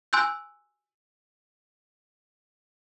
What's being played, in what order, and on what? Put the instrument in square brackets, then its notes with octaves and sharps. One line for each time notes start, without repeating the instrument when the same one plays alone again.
[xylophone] G#5 C6 E6 F#6 G6